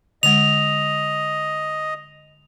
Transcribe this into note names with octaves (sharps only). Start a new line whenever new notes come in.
D3 G#3 D#5 F7